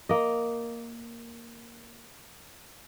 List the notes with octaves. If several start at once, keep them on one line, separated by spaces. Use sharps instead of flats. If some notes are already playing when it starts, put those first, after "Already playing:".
A#3 D#5